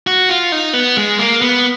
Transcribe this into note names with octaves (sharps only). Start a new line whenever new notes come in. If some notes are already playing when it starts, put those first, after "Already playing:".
F#4
F4
D#4
B3
G#3
A#3
B3